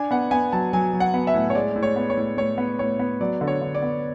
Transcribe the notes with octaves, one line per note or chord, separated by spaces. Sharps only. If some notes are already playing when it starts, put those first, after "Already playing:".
Already playing: D4 G#5
B3 F#5
B3 G#5
F#3 A5
F#3 G#5
F#3
F#5
B3
E5
A2
C#5
G#3 D5
A2
C#5
B3
C#5
A2
A2 C#5
B3
A2 C#5
B3
F#3 D5
D3
C#5
D3
D5
B3